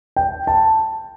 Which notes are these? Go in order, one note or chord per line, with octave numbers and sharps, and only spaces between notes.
G5
A5